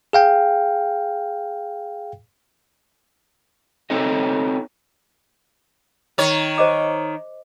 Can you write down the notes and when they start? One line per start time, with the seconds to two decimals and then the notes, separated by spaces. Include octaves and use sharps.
0.13 G#4 F5 G5
3.90 C4 D#4 A4 C#5 D#5
6.18 D#3 C#5
6.58 C5 D#5 D6